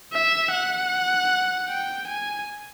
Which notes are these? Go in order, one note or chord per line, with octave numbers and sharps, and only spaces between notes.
E5
F#5
G5
G#5